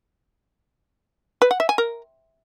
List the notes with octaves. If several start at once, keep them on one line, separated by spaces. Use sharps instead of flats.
B4
F#5
E5
G#5
A#4